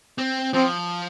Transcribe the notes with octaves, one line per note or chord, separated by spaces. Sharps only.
C4
F3 C4